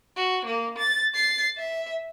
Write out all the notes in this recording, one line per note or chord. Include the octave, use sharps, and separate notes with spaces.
F#4
A#3
A6
A6 C7
E5